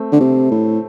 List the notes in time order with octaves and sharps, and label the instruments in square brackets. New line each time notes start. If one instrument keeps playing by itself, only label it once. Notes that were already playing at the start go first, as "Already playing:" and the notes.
Already playing: [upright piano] A3 C4
[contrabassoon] D3
C3
A2